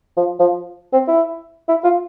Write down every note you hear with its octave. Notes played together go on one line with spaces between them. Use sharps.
F3
F3
C4
E4
E4
F4